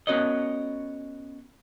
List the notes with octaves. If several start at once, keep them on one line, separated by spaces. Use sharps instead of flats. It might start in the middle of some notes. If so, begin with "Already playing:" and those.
B3 C#4 F#4 A#4 C#5 D#5